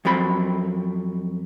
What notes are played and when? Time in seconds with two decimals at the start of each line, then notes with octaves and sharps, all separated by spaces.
0.05 F2 F#3 C4 B5